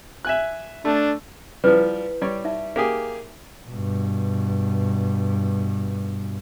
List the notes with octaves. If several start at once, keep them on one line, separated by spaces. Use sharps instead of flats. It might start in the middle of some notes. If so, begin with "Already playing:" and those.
E5 G#5 F#6
A3 D4
F3 G3 E4 B4
G3 C#5 D5
D#4 E5
A#3 G4 G#4
G2 B2